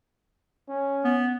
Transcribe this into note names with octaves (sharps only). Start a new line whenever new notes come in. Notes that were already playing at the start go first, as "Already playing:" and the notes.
C#4
B3